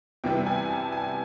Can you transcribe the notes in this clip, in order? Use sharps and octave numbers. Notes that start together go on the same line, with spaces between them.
C3 E3 G3 B3 G5
G#5
A5
G#5